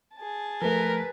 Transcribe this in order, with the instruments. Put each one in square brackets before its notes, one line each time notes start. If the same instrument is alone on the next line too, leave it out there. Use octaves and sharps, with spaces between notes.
[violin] G#4 A5
[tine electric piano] F3 A3 [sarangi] A#4 [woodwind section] B4